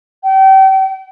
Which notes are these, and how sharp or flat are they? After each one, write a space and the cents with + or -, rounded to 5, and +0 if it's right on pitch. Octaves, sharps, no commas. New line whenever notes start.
G5 -35